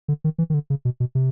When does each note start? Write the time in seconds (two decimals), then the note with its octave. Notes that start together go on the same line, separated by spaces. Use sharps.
0.08 D3
0.24 D#3
0.38 E3
0.50 D#3
0.54 D3
0.70 C#3
0.85 B2
1.00 B2
1.15 C3